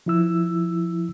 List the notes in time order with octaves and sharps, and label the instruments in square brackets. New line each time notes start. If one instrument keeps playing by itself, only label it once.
[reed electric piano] F3 E4 E6